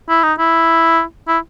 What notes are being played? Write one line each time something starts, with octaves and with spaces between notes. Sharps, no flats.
E4
D#4
E4
E4